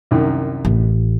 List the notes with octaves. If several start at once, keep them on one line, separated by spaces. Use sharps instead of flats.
C2 F#2 D#3
A1